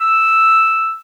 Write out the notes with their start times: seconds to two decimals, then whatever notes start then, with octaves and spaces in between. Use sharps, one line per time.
0.01 E6